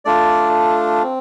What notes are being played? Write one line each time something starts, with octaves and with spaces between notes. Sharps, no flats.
A3 D4 F4 D5
C4